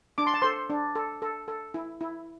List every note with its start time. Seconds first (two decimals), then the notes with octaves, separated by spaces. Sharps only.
0.18 D4 D6
0.27 C6
0.34 A5
0.42 A4 C5 C6
0.70 D4
0.95 A4
1.22 A4
1.48 A4
1.74 E4
2.01 E4